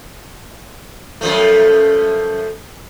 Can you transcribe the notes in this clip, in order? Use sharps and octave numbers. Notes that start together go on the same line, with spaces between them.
F#2 F3 A3